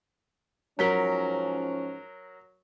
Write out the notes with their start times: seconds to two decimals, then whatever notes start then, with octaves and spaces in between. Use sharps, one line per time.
0.79 G#2 F3 F#3 C#4 A#4 C#5 B6 G7